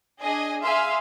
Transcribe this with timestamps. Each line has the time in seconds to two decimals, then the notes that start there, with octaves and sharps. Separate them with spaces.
0.21 D4 G#4 D#5 G#5
0.64 G#4 E5 F5 G#5 C6